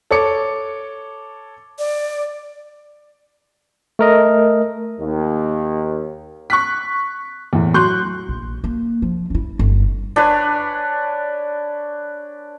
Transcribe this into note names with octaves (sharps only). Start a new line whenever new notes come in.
A4 C#5 D6 C#7
D5
A3 A#4 D#5
D#2
C#6 F#6 B6
E2 A2
F#3 C6 C#6 F#6 G6
A#1
A#3
F3
D4 E4
G1
D4 B4 C#5 G#5